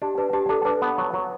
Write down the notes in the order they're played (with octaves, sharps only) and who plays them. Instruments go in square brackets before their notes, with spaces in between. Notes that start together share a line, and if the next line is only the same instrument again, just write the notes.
[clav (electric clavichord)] D4 [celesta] G4
[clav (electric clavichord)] D4 [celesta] B4
[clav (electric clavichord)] D4 [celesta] G4
[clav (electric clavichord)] D4 [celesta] A4
[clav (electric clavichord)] D4 [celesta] B4
[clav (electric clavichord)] B3
F#3
F#3